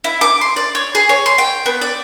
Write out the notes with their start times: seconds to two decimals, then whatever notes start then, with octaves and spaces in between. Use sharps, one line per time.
0.04 E4
0.21 D6
0.41 C6
0.56 D5
0.75 C#5
0.95 G#4
1.09 C#5
1.26 C6
1.38 G5
1.66 B3
1.82 D5